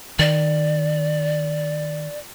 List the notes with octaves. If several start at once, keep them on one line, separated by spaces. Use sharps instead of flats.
D#3 D5